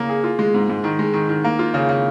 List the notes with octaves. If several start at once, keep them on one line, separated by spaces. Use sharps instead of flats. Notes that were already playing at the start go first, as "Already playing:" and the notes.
Already playing: C#3 A#3
G#4
F4
G#3
G#2
G#2
D#3
G#3
D#3
D#3
A#3
F4
C#3
C#3